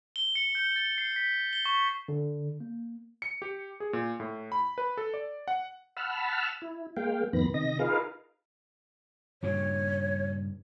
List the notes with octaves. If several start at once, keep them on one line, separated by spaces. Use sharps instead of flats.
G7
C#7
G6
A6
C7
B6
G7
C#6
D3
A#3
C#7
G4
G#4
A#2
A2
B5
B4
A4
D5
F#5
F#5 A5 B5 E6 F6
E4
G#3 A#3 F5 G5
F2 A2 D#3 B3 B5 A#6
C3 D#3 D#5 A#6
D#4 F4 G#4 A#4 B4 F5
G2 A#2 C#3 C#5